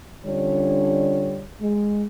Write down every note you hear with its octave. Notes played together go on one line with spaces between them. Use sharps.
D3 G3 C#4 D4 F4 C#5
G#3